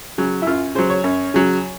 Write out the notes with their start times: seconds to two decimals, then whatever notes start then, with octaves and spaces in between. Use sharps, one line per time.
0.18 C#3 F#3
0.42 E4
0.47 F#2 F4
0.75 C#3 F#3 C5
0.90 C#5
1.04 F#2
1.34 C#3 F#3